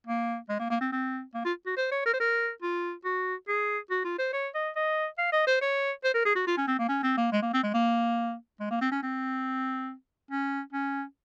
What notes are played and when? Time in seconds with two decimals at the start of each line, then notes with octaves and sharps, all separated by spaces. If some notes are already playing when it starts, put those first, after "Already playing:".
0.07 A#3
0.49 G#3
0.60 A#3
0.70 A#3
0.81 C4
0.92 C4
1.34 A#3
1.45 F4
1.66 F#4
1.77 C5
1.92 C#5
2.06 A#4
2.14 C5
2.20 A#4
2.62 F4
3.05 F#4
3.48 G#4
3.91 F#4
4.05 F4
4.18 C5
4.33 C#5
4.55 D#5
4.76 D#5
5.18 F5
5.32 D#5
5.47 C5
5.62 C#5
6.04 C5
6.14 A#4
6.25 G#4
6.36 F#4
6.47 F4
6.57 C#4
6.68 C4
6.79 A#3
6.89 C#4
7.03 C4
7.18 A#3
7.32 G#3
7.42 A#3
7.54 C4
7.63 G#3
7.74 A#3
8.60 G#3
8.71 A#3
8.81 C4
8.92 C#4
9.03 C4
10.31 C#4
10.73 C#4